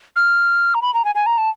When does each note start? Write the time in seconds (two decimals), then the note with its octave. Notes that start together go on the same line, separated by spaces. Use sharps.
0.16 F6
0.74 A#5
0.82 B5
0.94 A#5
1.05 G#5
1.15 G#5
1.26 A#5
1.38 A5